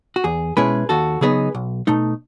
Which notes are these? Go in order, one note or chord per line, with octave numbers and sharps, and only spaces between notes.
F#4
E2 G#4
B2 G#3 C#4 E4 G#4 B4
D#2 F#4 A4
C#3 F#3 B3 D#4 G#4 B4
B1
B2 A3 D#4